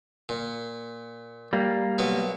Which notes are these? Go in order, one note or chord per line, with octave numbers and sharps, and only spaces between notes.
A#2
G3 A#3
B1 F#3 B3